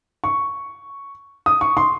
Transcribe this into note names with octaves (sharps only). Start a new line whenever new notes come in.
C#6
D#6
C#6
C6